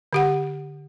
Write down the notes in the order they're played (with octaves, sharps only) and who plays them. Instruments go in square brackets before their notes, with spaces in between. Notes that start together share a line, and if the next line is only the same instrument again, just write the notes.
[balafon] D3 G4 F#5